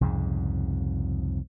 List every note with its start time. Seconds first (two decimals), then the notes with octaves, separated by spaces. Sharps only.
0.01 C2 F2 G#2 C#3